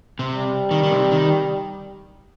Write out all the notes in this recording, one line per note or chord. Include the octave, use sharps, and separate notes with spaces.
C3
G3
D#3
D#3
C3
D#3